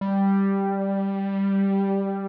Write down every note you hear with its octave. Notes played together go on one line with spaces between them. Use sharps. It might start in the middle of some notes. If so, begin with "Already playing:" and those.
G3